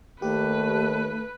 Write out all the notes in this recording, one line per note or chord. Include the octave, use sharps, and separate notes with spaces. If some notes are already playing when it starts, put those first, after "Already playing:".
D#2 A3 G4 B4